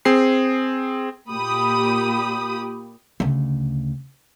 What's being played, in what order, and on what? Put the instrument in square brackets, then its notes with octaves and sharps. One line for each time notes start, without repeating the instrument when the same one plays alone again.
[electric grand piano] C4 G#4 C7
[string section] A#2 G4 B5 D#6
[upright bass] D2 C#3